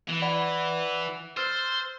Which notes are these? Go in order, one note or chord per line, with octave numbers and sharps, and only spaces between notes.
E3
D5 F#5 B5
C5 E6 F6 A6